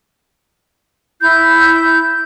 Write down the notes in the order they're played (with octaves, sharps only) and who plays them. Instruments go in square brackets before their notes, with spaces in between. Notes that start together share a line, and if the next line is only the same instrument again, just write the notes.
[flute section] E4 G6